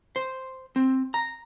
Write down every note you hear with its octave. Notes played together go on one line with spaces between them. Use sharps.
C5
C4
A#5